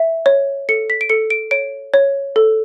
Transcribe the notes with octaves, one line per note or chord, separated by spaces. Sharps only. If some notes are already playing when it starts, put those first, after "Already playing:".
Already playing: E5
C#5
A4 C#7
B6
D7
A4 C#7
D7
C#5 D7
C#5
A4